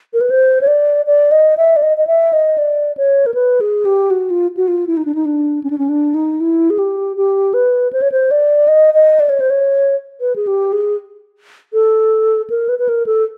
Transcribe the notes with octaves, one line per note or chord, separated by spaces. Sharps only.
A#4
B4
C5
C#5
D5
D5
D#5
E5
D5
D#5
D#5
E5
D#5
D5
C#5
A#4
B4
G#4
G4
F#4
F4
F#4
F4
E4
D#4
D4
D#4
D4
C#4
D4
C#4
D4
D#4
E4
G#4
G4
G4
B4
C5
C#5
C5
D5
D#5
D#5
D5
C#5
C5
C#5
B4
G#4
G4
G#4
A4
A#4
B4
B4
A#4
A4